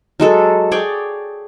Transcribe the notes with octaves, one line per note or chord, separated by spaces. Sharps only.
F#3 G#3 A4
G#4 C#5 D5 G5